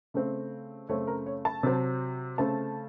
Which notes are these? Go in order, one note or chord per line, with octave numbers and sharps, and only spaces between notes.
C#3 A3 C4
F#2 C#3 A3 C4 C#5
A#4
C#5
A5
C3 F#3 C4
C#3 A3 C4 A5